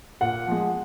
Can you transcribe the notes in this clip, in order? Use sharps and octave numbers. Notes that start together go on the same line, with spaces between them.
A#2 F#5
F3 G#3